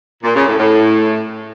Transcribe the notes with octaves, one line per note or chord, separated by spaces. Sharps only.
A#2
C#3
A2
A2